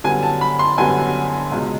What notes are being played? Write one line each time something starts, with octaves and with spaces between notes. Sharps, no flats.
F#2 D3 G3 B3 G#5
A5
B5
C6
F#2 D3 G3 B3 G#5
C#2 B2 G#3